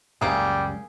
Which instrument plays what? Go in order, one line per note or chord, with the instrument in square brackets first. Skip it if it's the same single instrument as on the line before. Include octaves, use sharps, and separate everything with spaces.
[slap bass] F#1 C#2 F#2 [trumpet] G3 [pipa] A#3 G#4